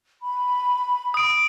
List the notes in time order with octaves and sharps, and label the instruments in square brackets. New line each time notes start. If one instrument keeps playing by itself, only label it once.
[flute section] B5
[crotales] D#6 D7